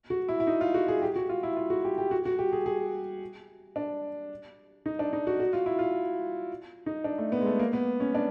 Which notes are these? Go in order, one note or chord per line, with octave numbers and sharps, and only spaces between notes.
F#4
E4
E4
D#4
F4
F#4
G#4
G4
F#4
F4
E4
F4
F#4
G4
G4
F#4
F#4
G4
G#4
G#4
D4
D#4
D4
D#4
F#4
F#4
F4
E4
F4
D#4
D4
A3
B3
G#3
A3
A#3
B3
C#4
D4